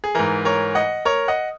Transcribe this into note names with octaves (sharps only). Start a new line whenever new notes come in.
G#4
G#2 E3 A#4
A#4 C#5
D#5 F#5
A#4 C#5
D#5 F#5